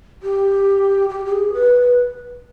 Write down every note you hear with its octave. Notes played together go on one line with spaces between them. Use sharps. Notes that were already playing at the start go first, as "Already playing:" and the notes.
G4
G4
G4
G#4
B4